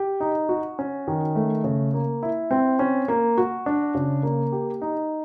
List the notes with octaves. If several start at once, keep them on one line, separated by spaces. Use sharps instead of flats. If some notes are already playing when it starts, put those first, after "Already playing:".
Already playing: G4
D#4
F#4
C#4
D#3
A3
C#3
A#3
E4
C4
C#4
A#3
F#4
D4
C#3
A#3
G4
D#4